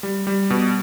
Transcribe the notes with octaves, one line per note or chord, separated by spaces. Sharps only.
G3
G3
B2